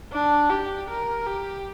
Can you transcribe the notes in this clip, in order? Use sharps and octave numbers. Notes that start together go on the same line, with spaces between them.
D4
G4
A#4
G4